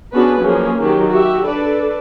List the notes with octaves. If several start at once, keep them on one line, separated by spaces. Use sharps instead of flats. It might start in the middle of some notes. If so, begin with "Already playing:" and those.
B3 C#4 D4 F#4 G#4 B4
F3 F#3 A#3 C#4 G#4
D#3 F#3 G4
F#4 G4 E5
D4 A4 B4 D5